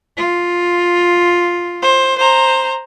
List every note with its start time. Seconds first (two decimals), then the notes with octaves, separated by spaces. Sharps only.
0.17 F4
1.82 C5
2.18 C5 A#5